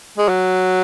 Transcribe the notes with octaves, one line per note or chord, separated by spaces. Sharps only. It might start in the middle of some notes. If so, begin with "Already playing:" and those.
G#3
F#3